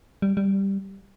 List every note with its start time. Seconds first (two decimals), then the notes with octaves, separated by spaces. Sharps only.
0.22 G3
0.37 G3